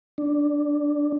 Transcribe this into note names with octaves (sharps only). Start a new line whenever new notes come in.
D4